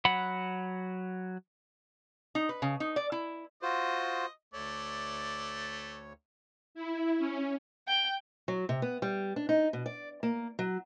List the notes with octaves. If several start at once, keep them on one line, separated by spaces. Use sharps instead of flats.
F#3 F#5 B5
D#4
B4
C#3
D#4
D5
E4
F4 F#4 C5 D#5
D2 A3 C#5 D5
E4
C#4
G5
F#3
C3
B3
G3
D4
D#4
B2
D5
A#3
F#3